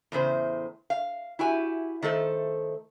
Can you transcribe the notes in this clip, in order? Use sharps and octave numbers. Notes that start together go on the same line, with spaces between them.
E2 A2 C#3 C5
F5
E4 F#4 G4 G#5
D#3 A3 A4 C5